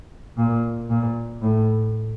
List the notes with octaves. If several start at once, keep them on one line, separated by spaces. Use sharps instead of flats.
A#2
A#2
A2